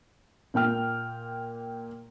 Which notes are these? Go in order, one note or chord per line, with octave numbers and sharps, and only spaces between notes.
A#2 A#3 G5 F6